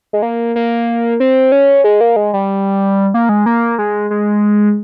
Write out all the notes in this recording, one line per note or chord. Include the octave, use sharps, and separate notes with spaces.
G#3
A#3
A#3
C4
C#4
G#3
A#3
G#3
G3
A#3
G#3
A#3
G#3
G#3